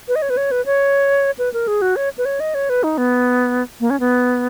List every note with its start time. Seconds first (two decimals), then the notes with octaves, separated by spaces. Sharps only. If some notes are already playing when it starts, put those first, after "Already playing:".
0.08 B4
0.16 D#5
0.22 C#5
0.30 B4
0.37 C#5
0.51 B4
0.66 C#5
1.39 B4
1.53 A#4
1.67 G#4
1.82 F#4
1.96 C#5
2.18 B4
2.25 C#5
2.40 D#5
2.55 C#5
2.70 B4
2.83 D#4
2.98 B3
3.80 A#3
3.90 C#4
4.00 B3